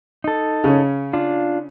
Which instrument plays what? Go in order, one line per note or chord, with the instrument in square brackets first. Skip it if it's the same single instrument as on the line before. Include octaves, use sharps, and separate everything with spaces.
[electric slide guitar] D#4 A4
[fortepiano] C#3 C#4
[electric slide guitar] D4 F4